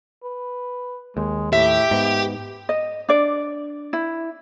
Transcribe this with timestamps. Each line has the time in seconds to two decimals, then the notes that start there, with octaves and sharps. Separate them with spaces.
0.24 B4
1.17 D#2 G#3
1.53 A2 G4 E5 B6
1.91 G#2 B3
2.69 D#5
3.08 D4 D5
3.93 E4